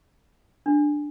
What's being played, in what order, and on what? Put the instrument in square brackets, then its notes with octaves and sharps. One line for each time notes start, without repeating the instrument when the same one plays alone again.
[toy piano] D4